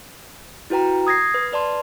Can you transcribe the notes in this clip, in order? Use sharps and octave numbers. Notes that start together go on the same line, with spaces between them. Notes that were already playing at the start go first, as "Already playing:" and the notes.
E4 F#4 B4 G5 A#5
D#6 G#6 A#6 C7
B4
B4 D5 A5 C6